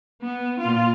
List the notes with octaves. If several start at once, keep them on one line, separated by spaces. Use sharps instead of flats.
B3
A#2 F4